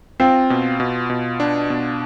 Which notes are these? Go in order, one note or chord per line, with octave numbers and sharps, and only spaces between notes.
C4 F4
B2
B2
B2
D4
B2